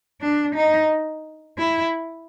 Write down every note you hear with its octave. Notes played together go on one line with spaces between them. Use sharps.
D4
D#4
E4